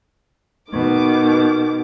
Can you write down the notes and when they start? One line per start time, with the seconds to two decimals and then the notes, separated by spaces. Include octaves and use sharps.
0.70 B2 D#3 D6